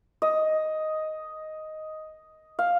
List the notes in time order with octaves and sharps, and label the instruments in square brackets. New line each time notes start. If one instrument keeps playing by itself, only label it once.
[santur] D#5
F5